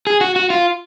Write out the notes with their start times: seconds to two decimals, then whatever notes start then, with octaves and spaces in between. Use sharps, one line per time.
0.07 G#4
0.21 F#4
0.36 F#4
0.50 F4